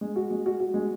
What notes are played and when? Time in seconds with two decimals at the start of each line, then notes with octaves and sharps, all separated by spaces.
0.01 G#3
0.16 F#4
0.31 G#3
0.46 F#4
0.60 F#4
0.74 G#3